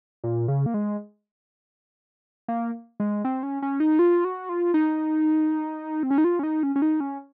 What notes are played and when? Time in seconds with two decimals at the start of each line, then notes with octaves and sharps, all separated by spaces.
0.24 A#2
0.48 C#3
0.66 A#3
0.74 G#3
2.48 A#3
3.00 G#3
3.25 C4
3.43 C#4
3.62 C#4
3.80 D#4
3.99 F4
4.25 F#4
4.49 F4
4.74 D#4
6.03 C4
6.11 C#4
6.18 D#4
6.24 F4
6.39 C#4
6.43 D#4
6.63 C#4
6.76 C#4
6.82 D#4
7.00 C#4